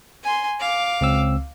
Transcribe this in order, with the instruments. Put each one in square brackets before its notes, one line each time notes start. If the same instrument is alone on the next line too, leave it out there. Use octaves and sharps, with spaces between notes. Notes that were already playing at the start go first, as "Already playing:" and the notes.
[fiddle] G#5 C6
F5 D6
[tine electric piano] C#2 C4 E6